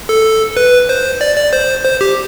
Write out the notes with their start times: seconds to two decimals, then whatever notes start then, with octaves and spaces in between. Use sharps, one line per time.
0.09 A4
0.57 B4
0.89 C5
1.21 D5
1.37 D5
1.53 C5
1.85 C5
2.01 G4